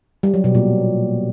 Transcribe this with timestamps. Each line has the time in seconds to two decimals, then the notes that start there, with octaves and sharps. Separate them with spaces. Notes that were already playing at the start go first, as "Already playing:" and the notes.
0.23 G3
0.34 F#3
0.44 B2
0.55 A#2